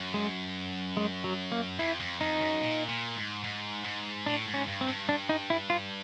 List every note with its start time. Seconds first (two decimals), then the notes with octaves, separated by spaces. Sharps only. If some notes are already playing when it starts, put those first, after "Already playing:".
Already playing: F#2
0.14 G#3
0.97 G#3
1.24 F#3
1.52 A#3
1.79 F2 E4
2.00 F2
2.20 F2 D#4
2.41 F#2
2.61 A#2
2.89 A#2
3.16 G#2
3.44 G#2
3.84 G#2
4.26 A2 D4
4.47 G#2
4.54 C#4
4.67 G2
4.81 C4
4.87 G2
5.09 D4
5.29 D#4
5.50 E4
5.70 F4